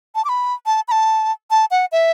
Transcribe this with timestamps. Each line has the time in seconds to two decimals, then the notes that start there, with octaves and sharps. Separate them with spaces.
0.15 A5
0.25 D6
0.29 B5
0.66 A5
0.88 B5
0.92 A5
1.51 A5
1.71 F#5
1.92 E5